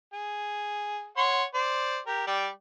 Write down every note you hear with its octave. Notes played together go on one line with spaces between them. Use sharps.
G#4
C#5 F#5 C6
C5 D5
G4 A#4
G3 D5 G5